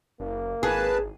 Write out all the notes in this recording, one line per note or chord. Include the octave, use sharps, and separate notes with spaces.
F#1 A#3
G#1 G#4 B4 A5